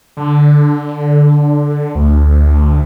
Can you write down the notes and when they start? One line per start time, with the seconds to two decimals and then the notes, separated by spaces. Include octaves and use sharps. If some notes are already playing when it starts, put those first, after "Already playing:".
0.17 D3
1.95 D2